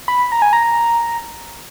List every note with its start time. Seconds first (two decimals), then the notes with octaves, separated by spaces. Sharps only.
0.08 B5
0.32 A#5
0.42 G#5
0.53 A#5